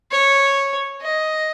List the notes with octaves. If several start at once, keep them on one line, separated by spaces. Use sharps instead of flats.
C#5
D#5